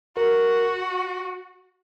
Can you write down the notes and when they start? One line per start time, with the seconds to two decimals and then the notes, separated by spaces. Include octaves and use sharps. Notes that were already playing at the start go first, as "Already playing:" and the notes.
0.16 F#4 A#4